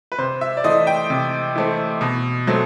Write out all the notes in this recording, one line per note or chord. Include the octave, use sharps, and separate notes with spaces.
B4
C3 C5
E5
D5
E3 A3 C4 D#5
G5
C3
E3 A3 C4
B2
F#3 A3 C4